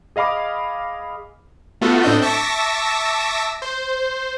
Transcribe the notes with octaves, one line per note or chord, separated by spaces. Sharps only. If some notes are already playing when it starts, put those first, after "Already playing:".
G#4 D#5 F5 B5 D6
A3 B3 F4 F#4 A4
A2 C4 D4 A4 D#5 G6
E5 A5 C#6 D6 E6 A#6
C5